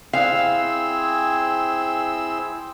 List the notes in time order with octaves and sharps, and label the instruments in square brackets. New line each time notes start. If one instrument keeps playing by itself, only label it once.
[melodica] C4 G#4 [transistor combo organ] E4 C5 E6 [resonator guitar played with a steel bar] F5